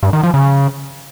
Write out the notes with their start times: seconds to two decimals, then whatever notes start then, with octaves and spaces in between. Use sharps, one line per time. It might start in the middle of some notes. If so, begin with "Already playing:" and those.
0.03 G2
0.13 D#3
0.23 F3
0.34 C#3